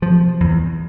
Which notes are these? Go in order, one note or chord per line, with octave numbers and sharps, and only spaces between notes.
C3 F3
E2